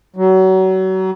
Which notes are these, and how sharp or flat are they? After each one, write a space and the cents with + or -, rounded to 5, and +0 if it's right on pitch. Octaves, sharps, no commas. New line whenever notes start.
F#3 +30